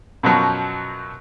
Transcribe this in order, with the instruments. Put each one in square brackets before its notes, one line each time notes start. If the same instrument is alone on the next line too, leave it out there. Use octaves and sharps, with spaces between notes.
[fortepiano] F#2 B2 F3 F#3